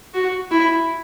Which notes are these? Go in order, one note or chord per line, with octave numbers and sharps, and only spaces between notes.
F#4
E4